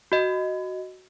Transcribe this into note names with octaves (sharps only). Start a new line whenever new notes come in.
F#4 D#5